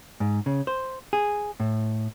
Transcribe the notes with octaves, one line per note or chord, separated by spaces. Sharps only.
G#2
C#3
C5
G#4
A2